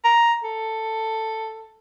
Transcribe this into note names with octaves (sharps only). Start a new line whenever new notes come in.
A#5
A4